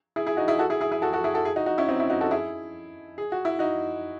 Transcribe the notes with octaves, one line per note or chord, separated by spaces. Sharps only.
E4 G#4
E4 G#4
D#4 F#4
E4 G#4
F#4 A4
E4 G#4
E4 G#4
E4 G#4
F#4 A4
F#4 A4
E4 G#4
F#4 A4
E4 G#4
D#4 F#4
D#4 F#4
C#4 E4
C4 D#4
C#4 E4
D#4 F#4
F#4 A4
E4 G#4
G#4
F#4
E4
D#4 F#4